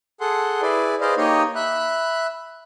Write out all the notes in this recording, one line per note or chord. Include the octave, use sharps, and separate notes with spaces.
G#4 A4 F#5 C6
E4 G#4 B4 D5
G#4 B4 C5 D5 D#5 F5
A#3 D#4 G4 C#5 D#5
E5 B5 F#6